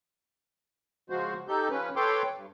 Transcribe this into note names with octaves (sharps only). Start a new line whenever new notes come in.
C#3 F3 G#3 F#4 C5
D#4 G4 A4 G6
F3 C#4 B4
A4 B4 C#5 G5 C6 D6
G2